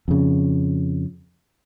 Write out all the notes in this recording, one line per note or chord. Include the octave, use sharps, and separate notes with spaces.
F2 C#3